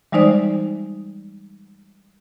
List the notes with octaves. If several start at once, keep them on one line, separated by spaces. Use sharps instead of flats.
E3 G3 G#3 D#4 C5 D5